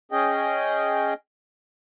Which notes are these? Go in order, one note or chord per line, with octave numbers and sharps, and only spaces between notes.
C#4 G#4 D#5 G5